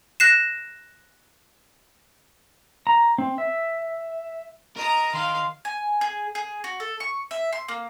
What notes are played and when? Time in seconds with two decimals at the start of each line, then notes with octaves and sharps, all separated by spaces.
0.20 F#6 A#6 C7 E7
2.87 A#5
3.18 C4
3.38 E5
4.76 A#4 D#5 A#5
5.14 D#3 F5 C6
5.65 G#5
6.01 G#4
6.35 G#4
6.64 F#4
6.80 A4
7.00 C#6
7.31 E5
7.53 C6
7.68 A#3